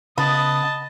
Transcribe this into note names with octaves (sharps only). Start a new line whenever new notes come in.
C#3 B3 D#5 A5